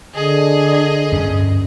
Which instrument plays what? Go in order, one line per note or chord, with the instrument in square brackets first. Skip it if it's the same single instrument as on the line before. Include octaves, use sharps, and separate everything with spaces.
[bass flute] D3 [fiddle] G#4 D#5
[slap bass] D2 G2 C#4